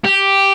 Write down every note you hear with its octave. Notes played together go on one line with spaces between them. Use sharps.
G4